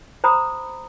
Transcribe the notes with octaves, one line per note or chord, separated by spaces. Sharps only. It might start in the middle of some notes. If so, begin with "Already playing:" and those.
C5 A#5 B5 D#6